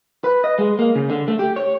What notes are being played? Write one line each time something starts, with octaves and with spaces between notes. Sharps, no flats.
B4
D#5
G#3
A#3
C#3
D3
A3
G4
C#5